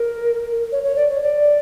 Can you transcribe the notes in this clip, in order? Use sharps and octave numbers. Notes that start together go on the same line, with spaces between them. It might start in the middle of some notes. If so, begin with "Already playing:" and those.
Already playing: A#4
C#5
C#5
D5
C#5
D5